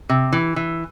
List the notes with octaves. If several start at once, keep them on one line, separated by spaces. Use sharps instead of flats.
C3
E3
E3